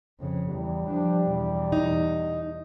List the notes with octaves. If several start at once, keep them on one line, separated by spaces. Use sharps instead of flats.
F2 C#3
E2 G3
F3 D4
E2 B2
D#4